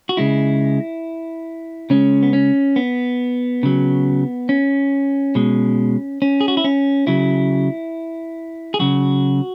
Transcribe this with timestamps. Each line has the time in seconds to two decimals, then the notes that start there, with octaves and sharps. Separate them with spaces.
0.09 F#4
0.17 C#3 G#3 E4
1.90 C#3 G#3 C#4
2.23 B3
2.33 C#4
2.76 B3
3.63 C#3 F#3
4.49 C#4
5.35 B2 G#3
6.22 C#4
6.41 G#4
6.48 F#4
6.57 E4
6.64 C#4
7.07 C#3 F#3 E4
8.74 G#4
8.79 C#3 F#3 F#4